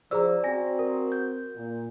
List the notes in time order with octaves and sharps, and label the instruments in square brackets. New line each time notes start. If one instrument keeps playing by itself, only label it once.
[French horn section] F3 [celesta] G#4 C5 E6 [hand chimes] D5 A#5
[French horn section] C4 F#4 [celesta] G#5 A#6
[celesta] A#4
[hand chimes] G6
[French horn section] A#2